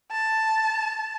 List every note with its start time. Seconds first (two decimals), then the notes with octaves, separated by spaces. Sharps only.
0.11 A5